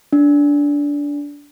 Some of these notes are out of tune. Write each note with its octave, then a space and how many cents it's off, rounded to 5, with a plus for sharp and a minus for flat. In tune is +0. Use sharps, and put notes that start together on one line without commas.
D4 -20